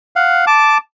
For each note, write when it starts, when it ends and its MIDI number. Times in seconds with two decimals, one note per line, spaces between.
0.16 0.45 77
0.16 0.45 78
0.47 0.78 81
0.47 0.78 86